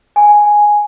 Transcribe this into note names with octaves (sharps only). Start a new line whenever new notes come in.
G#5